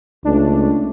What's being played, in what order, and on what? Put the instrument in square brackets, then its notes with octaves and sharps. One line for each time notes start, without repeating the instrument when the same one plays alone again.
[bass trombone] C#2 [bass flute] A3 [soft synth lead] D4